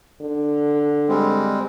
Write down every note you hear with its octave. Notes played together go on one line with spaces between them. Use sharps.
D3
G3 G#3 C4